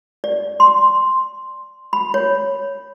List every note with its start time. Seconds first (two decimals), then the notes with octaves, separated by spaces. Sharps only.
0.24 D5
0.60 C6
1.93 B5
2.14 C#5